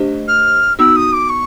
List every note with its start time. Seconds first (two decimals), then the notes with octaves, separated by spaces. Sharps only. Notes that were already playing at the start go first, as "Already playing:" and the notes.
Already playing: A3 D4 G4 C5 D#5
0.27 F6
0.79 B3 D#4 F#4 E6
0.96 D#6
1.13 D6
1.29 C#6